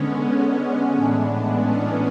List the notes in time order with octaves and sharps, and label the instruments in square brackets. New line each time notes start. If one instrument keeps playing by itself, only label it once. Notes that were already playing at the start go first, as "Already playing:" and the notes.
Already playing: [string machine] D3 G#3 B3 C#4
A2 E3 G#3 D4
B3
C#4